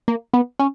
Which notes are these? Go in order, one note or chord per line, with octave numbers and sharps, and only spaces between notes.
A#3
B3
C#4